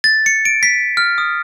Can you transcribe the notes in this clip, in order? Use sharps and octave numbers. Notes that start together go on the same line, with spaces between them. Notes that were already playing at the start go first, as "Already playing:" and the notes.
A6
C#7
D7
B6
F6
D#6